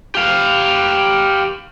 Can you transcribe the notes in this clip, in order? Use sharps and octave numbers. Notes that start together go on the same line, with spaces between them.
G4 F5